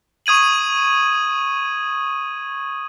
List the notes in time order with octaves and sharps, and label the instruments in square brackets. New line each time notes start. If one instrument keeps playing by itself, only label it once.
[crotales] C#6 D#6 G#6 D#7 F#7